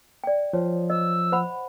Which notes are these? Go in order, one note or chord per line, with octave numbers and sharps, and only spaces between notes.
D5 G5
F3 C#5
D#5 E6
C5 F#5 B5